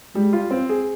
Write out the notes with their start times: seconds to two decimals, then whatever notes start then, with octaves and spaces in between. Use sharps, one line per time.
0.15 G3 G#3
0.33 F4
0.51 C4
0.69 G#4